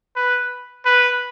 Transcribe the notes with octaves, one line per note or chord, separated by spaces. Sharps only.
B4
B4